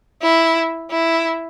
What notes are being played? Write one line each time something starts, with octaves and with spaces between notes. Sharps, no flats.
E4
E4